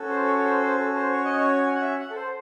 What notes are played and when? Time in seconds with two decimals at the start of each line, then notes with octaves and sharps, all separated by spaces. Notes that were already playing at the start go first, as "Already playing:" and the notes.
Already playing: C#4 F#4 A4
0.10 C5
0.28 C#5
0.39 C#5
0.44 C5
0.62 C5
0.79 A4
0.96 C5
1.13 C#5
1.25 D#5
1.36 C#5
1.67 G#5
1.74 F#5
1.81 E5
1.99 F#5
2.10 A4
2.16 C5